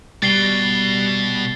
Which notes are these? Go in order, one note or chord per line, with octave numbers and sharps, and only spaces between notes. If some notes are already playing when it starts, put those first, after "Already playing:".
B2 G3 A6 C7 G7